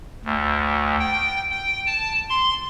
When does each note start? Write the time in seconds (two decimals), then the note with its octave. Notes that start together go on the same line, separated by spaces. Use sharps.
0.25 D2
0.99 G5
1.50 G5
1.87 A5
2.30 C6